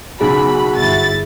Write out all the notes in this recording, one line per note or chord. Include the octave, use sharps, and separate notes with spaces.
B1 C#3 F#4 G#4 B5
G1 E4 A6